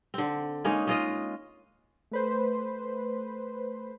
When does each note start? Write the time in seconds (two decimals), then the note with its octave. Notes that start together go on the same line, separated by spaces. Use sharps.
0.14 D3 C4
0.65 G#3 A#3 C#4 D#4
0.87 G#3 F4 D#5
2.11 A3 B4 C5